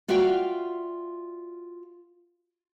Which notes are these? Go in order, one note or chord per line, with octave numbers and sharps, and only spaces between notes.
F4 F#4 D5 E5 F5 G5